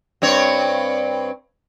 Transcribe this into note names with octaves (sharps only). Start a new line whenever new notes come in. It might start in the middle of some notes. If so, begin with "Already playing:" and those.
G2 C4 C#5